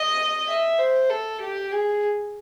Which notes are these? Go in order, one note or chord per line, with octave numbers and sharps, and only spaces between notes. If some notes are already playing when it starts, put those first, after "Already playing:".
Already playing: D#5
E5
C5
A4
G4
G#4